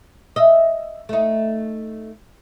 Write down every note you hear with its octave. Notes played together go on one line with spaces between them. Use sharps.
D#5 E5
A3 D#4